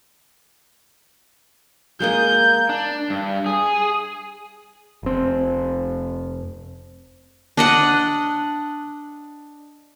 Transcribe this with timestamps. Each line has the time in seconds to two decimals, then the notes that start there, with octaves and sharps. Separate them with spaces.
2.00 G#3 A#3 D#5 G6
2.69 D4
3.10 G2
3.46 G#4
5.03 F1 C4
7.57 D4 D#5 F#5